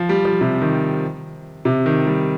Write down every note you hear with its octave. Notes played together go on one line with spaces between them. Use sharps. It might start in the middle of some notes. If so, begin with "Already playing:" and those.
Already playing: F3
G3
F3
C3
D#3
C3
D#3
G3